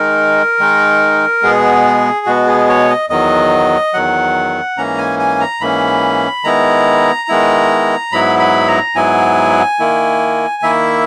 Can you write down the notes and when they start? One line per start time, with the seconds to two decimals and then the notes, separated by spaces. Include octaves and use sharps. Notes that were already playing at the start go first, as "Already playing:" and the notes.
Already playing: D#3 G#3 D#4 A#4
0.59 D#3 G#3 D#4
1.43 B2 G#3 B3 G#4
2.26 B2 G#3 B3 F#4
2.47 G#4
2.69 C#5
2.90 D#5
3.10 E2 D#3 F#3 D#5
3.93 E2 D#3 F#3 F#5
4.77 G#2 E3 A#3 C#4 A#5
4.98 G#5
5.19 G#5
5.40 A#5
5.60 G#2 E3 A#3 C#4 B5
6.44 D#3 G#3 B3 E4 A#5
7.29 D#3 G#3 B3 E4
8.12 G#2 F#3 B3 E4 B5
8.39 B5
8.68 A#5
8.95 G#2 F#3 B3 E4 G#5
9.80 D#3 A#3 E4
10.62 D#3 A#3 E4 E5